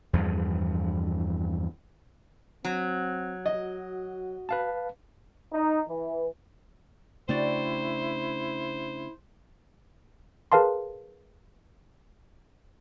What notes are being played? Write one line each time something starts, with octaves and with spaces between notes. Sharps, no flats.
E2 G2 F3
F#3 C4
F#4 D#5
B4 F5 A5
D#4
E3
C#3 A3 D4 E4 F#4 C5 D5 G5
G#4 A#4 B4 F5 A5 C6